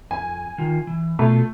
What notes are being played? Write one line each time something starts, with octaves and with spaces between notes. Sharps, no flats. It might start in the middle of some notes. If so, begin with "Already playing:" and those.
F2 G#5
D#3 F4
E3
B2 A3 F4